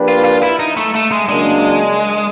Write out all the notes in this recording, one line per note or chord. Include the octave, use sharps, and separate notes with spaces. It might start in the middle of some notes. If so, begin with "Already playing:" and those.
Already playing: F3 A#3 D4 G4 B4
F4
F4
E4
D#4
A3
A3
G#3
C#3 F#3 G#3 A#3 D4